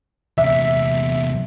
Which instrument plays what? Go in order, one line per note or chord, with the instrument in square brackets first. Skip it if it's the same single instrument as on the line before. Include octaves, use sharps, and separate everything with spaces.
[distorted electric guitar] E2 C3 [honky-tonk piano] E5